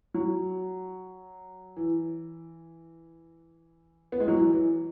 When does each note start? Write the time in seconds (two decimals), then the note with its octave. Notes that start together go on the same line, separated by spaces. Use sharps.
0.14 F#3
1.76 E3
4.12 B3
4.20 G#3
4.28 F#3
4.36 E3
4.53 E3